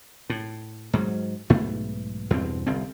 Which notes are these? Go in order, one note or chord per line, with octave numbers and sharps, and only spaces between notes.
A2
G#2 F#3
B1 G#2 A3 B3
E2 G2 B2 C4
G1 C2 C4